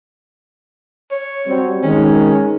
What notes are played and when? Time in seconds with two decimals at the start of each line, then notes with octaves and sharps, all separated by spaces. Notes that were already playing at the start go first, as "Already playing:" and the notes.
1.12 C#5
1.47 F#3 G3 C4
1.83 D#3 G#3 C#4